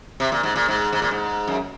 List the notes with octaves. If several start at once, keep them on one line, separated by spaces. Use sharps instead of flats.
C3
A#2
G#2
A#2
G#2
G#2
A#2
G#2
F#2